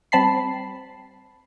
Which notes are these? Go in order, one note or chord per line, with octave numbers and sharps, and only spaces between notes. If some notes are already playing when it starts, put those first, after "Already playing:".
G3 C4 A5 B5 C7